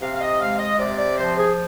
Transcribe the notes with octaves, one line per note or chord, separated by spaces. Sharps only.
C3 F5
F5
D#5
G#3 F5
D#5
C3 D5
D5
F3 C5
G#4